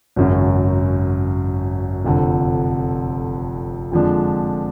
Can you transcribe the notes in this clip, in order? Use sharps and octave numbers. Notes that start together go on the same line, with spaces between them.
G#1 F#2 C#3 F#3
F1 F2 D3
F2 D3 F3 G#3 D4